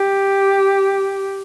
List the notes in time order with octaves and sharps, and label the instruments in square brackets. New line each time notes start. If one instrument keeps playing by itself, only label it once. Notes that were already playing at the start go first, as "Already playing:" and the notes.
Already playing: [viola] G4